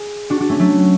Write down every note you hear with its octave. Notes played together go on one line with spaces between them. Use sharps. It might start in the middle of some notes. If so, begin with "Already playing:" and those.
Already playing: G#4
D4 F#4
D4 F#4
A3 C#4
F#3 A3